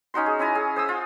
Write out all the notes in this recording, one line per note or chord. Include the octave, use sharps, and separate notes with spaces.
C#4 D#4 F#4 C6
G#4
C#4 E4 G#5 A#5
G#4
C5 D#6 E6
F4